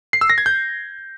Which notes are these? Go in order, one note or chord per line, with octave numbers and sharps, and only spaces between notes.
C7
E6
A#6
G#6
G6